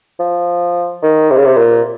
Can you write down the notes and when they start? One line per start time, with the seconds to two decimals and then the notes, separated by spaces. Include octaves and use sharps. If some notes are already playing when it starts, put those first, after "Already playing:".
0.20 F3
1.03 D#3
1.31 C3
1.37 C#3
1.45 C3
1.57 A#2